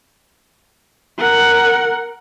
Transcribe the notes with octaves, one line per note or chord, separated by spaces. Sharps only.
A#4 F#5